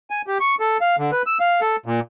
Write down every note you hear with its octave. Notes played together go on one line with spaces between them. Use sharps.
G#5
G4
C#6
A4
F5
D3
B4
E6
F5
A4
A#2